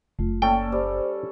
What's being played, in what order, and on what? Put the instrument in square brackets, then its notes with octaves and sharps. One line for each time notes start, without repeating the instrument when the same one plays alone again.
[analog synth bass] F#1 [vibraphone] A3 F4
[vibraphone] A#3 D5 A5 [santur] C#4 A4 [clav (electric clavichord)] G5
[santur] G3 [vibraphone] C5